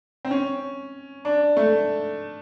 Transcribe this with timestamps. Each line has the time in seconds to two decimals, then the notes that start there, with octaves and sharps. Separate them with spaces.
0.25 C4
0.31 C#4
1.25 D4
1.57 A3